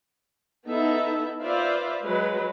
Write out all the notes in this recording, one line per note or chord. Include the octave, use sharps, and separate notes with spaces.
B3 D#4 E4 A4 E5
F4 B4 C5 D5 E5 F5
F#3 G#3 B4